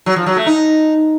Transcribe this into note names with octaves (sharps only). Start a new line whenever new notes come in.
F#3
F3
F#3
A3
D#4